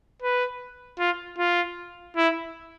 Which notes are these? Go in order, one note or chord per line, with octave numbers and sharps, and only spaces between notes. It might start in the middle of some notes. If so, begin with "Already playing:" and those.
B4
F4
F4
E4